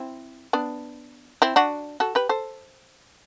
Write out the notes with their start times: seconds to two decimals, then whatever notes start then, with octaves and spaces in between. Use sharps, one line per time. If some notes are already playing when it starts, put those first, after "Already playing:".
Already playing: C4 E4
0.53 B3 D4
1.42 C4 E4
1.56 D4 F#4
2.00 F#4 A4
2.15 G4 B4
2.29 A4 C5